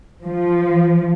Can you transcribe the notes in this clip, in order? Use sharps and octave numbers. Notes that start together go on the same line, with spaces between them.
F3